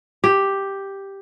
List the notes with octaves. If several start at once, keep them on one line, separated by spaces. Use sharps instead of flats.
G4